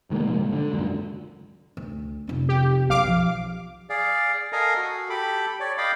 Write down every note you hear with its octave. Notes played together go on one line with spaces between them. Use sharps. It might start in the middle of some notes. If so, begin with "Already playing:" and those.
F1 D#3 G#3 A#3
B2 F3 G#3 A#3
G1
D3
G#1 C#2 F#2 A#2
D2
F1 C#4
G4
B1 F5 D6
F3
G#4 D5 F5
A4 A#4 D#5 F5 G#5 A#5
F#4
G4 A4 B5 D6
C#5 D5
D5 D#5 F5 G5 B5 D6